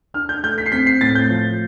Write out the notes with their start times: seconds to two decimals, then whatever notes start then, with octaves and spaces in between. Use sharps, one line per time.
0.14 D4 F6
0.29 G6
0.44 A3 G6
0.58 B6
0.66 C7
0.72 C4 B6
0.86 C7
1.01 A2 A6
1.15 G6
1.30 F3